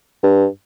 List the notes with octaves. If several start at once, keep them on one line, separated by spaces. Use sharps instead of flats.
G2